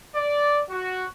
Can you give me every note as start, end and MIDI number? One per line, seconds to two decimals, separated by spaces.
0.16 0.61 74
0.70 1.06 66